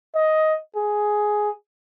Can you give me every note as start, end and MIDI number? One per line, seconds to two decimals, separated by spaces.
0.15 0.56 75
0.76 1.50 68